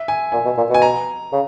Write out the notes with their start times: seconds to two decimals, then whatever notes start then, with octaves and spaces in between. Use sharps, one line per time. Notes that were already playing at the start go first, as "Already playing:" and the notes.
Already playing: E5
0.08 G#5
0.32 A#2 G#5
0.45 B2
0.57 A#2
0.70 B2 G#5
0.82 A#5
1.32 C#3